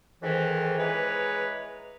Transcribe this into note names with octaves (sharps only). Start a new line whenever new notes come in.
F2 G#2 D#3 E3
E3 G#3 B4 C#5 A#5 B5